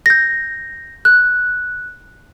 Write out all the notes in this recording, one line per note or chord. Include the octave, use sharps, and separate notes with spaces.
G6 A#6
F#6